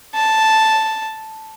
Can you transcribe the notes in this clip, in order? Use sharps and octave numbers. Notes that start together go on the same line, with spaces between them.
A5